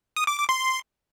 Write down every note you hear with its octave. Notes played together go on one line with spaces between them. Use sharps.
D#6
D6
D6
C6